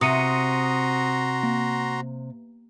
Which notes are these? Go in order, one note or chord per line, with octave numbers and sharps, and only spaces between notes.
C3 F#4 A#5 C6 D#6 C#7 D#7
A#3